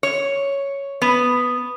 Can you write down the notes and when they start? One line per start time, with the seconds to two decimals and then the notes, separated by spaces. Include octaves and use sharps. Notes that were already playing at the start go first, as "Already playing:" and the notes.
0.03 C#5
1.02 B3